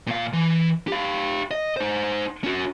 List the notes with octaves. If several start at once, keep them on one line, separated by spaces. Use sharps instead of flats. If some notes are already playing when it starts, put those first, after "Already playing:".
A#2 F5
E3
G4 F5
D#5
D#4 C5
C#4 F#4